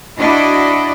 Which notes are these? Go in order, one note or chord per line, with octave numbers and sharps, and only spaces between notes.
D4 E4 F#4 D5 D#5